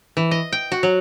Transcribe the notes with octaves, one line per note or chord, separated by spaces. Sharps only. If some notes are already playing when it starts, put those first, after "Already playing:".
E3
D#5
G5
F#4
F#3